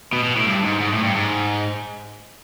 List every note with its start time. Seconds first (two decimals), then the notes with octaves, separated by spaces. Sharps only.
0.13 B2
0.24 B2
0.36 A2
0.46 G2
0.64 G#2
0.80 G#2
0.93 A2
1.03 G2
1.15 G#2